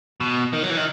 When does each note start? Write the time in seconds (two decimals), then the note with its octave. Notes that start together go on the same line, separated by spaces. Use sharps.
0.20 B2
0.53 D#3
0.63 F#3
0.70 E3
0.77 D#3